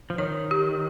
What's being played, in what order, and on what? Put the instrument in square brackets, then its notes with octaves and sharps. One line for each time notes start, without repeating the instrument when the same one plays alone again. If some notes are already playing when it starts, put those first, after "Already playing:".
[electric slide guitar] F3
[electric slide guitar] D#3 [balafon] C#5
[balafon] G4